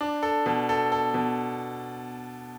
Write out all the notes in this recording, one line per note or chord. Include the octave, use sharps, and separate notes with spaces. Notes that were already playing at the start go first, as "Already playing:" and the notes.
D4
A4
B2
A4
A4
B2